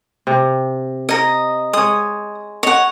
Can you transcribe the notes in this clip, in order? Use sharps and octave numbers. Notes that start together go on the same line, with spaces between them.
C3
D#5 A#5
G#3 C#5 D#6
C#5 D#5 F#5